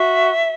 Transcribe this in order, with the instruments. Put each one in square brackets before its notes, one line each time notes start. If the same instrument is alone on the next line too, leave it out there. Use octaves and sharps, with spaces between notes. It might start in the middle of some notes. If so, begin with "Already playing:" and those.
Already playing: [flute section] F#4 E5